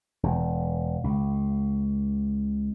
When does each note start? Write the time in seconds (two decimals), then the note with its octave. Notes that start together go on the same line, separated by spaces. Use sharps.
0.23 E1
1.04 C#2